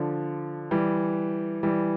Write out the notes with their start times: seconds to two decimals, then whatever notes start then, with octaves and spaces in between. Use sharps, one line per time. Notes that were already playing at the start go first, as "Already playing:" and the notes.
Already playing: D3 F3
0.71 E3 G3
1.63 E3 G3